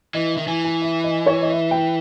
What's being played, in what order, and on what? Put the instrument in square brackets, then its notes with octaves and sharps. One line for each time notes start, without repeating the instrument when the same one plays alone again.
[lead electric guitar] E3 [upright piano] D#5
[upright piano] E5
[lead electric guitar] D#3
[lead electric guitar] E3 [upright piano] G#5
[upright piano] G#5
E5
D#5
C#5
D#5
E5
G5